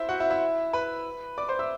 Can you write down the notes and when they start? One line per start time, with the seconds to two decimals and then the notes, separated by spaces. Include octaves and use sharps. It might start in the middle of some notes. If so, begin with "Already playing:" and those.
Already playing: E4 C5 E5
0.09 F#4 F#5
0.20 E4 E5
0.30 E4 E5
0.73 B4 B5
1.38 D5 D6
1.48 C5 C6
1.59 E5 E6